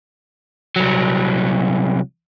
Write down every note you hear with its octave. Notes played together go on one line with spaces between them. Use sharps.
C2 F#3